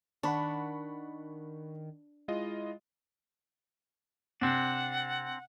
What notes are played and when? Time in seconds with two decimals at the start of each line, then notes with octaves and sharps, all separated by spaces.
0.23 D#3 D4 F#5 B5 C#6
2.28 G#3 E4 F4 D#5
4.41 C3 C4 D4 F#5